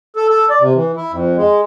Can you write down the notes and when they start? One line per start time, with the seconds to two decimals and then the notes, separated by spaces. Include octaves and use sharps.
0.16 A4
0.30 A4
0.50 D5
0.61 C3
0.75 E3
0.97 E4
1.12 F2
1.37 G#3